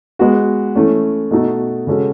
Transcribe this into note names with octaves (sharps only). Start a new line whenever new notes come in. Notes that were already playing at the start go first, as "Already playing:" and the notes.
G#3 B3 F#4
E3 A3 C#4
B2 A3 D#4 F#4 A4
C#3 G#3 C#4 F#4 A4